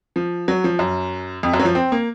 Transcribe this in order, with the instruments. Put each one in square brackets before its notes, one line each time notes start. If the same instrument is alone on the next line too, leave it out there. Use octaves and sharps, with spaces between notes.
[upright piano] F3
F#3
F3
F#2
F2
F#2
F#3
F3
C4
A#3